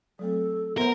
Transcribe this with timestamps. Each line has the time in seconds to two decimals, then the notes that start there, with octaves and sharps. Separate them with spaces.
0.19 F#3 A3 C4 A4
0.78 B3 A#4 C5 E5 F#5 C6